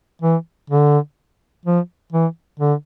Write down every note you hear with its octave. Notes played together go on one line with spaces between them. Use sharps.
E3
D3
F3
E3
D3